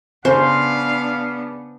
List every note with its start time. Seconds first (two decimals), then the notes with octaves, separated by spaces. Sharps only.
0.25 C#3 B3 D4 C5 F5